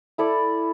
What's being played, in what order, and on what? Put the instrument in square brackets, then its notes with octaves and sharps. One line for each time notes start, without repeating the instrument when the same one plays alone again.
[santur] E4 A4 D5